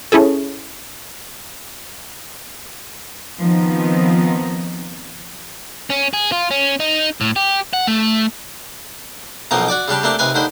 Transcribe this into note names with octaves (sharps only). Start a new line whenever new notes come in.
C#4 E4 G#4 A4
D#3 F3 B3 C4 D#4
C#4
G#4
F4
C#4
D#4
A2
G4
F#5
A3
B1 B2 F3 A#3 C4 D#4
F#4 D5 D6
C#3 G3 D4 G4
A3 A#3 C4 D4 G4
D#2 C3 B4 F5 G#5
D#2 D3 D#3 C5 B5